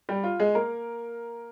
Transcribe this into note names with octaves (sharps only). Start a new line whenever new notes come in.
G3 G4
F4
G#3 G#4
A#3 A#4